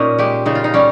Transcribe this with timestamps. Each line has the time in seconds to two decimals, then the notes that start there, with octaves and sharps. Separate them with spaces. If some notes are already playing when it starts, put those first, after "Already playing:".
Already playing: A#2 C#4 D#4
0.18 G#3 G4
0.46 C#3 D#4
0.55 F4
0.64 D#4
0.74 G3 C#4